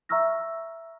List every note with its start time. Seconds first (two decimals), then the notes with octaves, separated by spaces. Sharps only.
0.09 E5 A#5 C#6 E6 F6 A#6